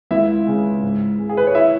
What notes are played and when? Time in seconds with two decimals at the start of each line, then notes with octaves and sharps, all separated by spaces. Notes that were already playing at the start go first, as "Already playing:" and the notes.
0.11 C#2 E4 E5
0.47 C#3 G#3
0.83 G#2
1.19 G#3
1.29 G#4
1.37 B4
1.47 C#5
1.55 E4 E5